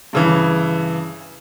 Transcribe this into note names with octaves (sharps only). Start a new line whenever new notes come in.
G2 C#3 E3